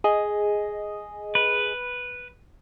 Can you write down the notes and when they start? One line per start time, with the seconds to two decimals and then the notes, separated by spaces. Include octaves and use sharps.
0.04 G#4 D#5
1.35 B4